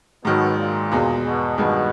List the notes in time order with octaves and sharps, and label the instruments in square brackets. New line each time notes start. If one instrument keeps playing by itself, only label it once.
[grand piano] G#2 D#3 F#3 [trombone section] B2
[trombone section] A#2
[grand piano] E2 B2 G#3
[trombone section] B2
[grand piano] G2 D#3 G#3 [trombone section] B2